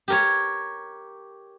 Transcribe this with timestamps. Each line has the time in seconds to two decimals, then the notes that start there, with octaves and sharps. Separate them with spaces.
0.08 G4 A#4 C#5